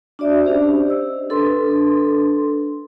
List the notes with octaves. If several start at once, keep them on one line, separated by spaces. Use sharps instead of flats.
D4 F#4 D5 E5
C#4 G4 C5
D#5 E6
D4 A4 B4 C6